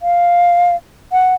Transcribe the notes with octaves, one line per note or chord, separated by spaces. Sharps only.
F5
F#5